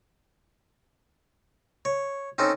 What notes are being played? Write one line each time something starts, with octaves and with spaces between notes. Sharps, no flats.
C#5
C4 C#4 D#4 A4